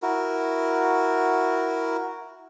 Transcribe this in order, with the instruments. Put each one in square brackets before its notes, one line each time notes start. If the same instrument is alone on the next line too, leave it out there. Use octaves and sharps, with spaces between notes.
[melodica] E4 F#4 A#4